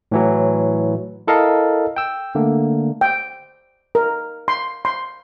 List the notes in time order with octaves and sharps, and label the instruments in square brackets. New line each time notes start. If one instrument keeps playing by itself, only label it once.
[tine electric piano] A2 E3 F#3
E4 A4 A#4 D#5 F5 A5
G5 E6
D3 A3 A#3
[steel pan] G5
A#4
C6
C6